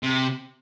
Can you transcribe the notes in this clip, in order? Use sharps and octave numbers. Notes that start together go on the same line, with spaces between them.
C3